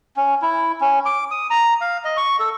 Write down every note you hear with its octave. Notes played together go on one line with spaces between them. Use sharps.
C#4
E4
C#4
D6
D#6
A#5
F5
D#5
C#6
A4